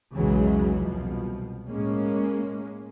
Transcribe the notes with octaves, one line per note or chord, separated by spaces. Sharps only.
B1 E2 C#3 E3 F#3 G#3
C2 B2 F3
A2 G#3 A#3 C#4